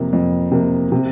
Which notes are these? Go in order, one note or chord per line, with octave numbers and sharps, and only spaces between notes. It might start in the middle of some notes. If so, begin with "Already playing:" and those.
Already playing: F2 C3 A#3
F2
C3 A#3
C3